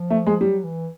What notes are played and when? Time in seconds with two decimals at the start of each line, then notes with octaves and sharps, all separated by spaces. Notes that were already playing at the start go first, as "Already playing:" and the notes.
Already playing: F3
0.10 A3
0.27 G#3
0.41 F#3 G3
0.64 E3